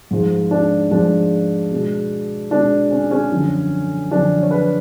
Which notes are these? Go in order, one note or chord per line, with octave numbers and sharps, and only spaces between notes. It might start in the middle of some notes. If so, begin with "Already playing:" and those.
G#2 F3 G#3
D4
G#2 F3 G#3 D4
B2 G#3
B2 G#3 D4
C#4
C#4
F#2 D3 F3
F#2 D3 F3 D4
C#5
B4